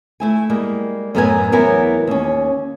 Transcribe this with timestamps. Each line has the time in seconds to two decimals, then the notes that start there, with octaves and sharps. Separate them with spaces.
0.20 A3 E4 G#5
0.50 G3 G#3 A#3
1.15 F#2 A2 B3 A#4 D#5 G#5
1.52 E2 F#3 B3 E4 A#4 G#5
2.07 D#2 C#4